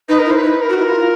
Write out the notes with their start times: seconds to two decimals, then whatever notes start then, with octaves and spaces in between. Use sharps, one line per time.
0.09 D#4 B4
0.19 A#4
0.25 E4
0.31 C5
0.35 B4
0.43 D#4
0.61 A#4
0.69 F#4
0.79 E4
0.87 F4